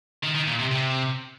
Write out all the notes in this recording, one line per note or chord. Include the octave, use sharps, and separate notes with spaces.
D#3
D#3
A#2
C3
C3